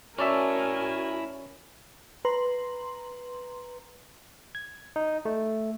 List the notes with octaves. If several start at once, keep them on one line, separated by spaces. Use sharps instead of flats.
C#4 E4 F#4 A#4 D5 E5 G#5 A5
B4 A#5 C6
G#6
D#4
A3